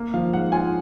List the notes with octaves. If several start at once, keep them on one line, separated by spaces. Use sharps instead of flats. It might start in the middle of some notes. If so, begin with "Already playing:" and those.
Already playing: A#3
F3 F5
G#2 F#5
F4 G#5